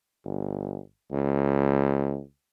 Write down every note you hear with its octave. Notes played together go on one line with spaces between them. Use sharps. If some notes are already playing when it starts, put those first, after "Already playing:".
G1
C#2